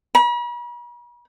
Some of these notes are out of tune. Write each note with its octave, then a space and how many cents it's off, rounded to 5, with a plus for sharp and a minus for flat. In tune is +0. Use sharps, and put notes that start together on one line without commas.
B5 -45